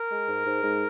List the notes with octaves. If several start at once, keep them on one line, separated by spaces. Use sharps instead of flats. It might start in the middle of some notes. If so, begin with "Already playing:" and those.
Already playing: A#4
G#3
G#2
G#2
G#2